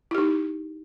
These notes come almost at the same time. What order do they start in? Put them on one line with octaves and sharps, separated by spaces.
E4 G4 D#4